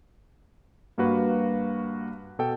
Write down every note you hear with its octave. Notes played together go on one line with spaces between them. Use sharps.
G2 A#3 F#4 B4
B2 A4 G5